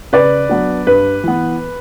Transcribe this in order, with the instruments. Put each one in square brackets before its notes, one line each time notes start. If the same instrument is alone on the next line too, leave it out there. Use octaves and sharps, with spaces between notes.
[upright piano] C#3 B4 D5
F#3 B3 D4
G2 B4
E3 B3